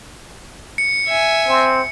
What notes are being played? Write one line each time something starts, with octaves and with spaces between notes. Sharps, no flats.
C#7
E5 G#5
C4